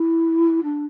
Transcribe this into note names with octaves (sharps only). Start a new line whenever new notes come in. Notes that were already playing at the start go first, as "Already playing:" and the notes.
Already playing: E4
D4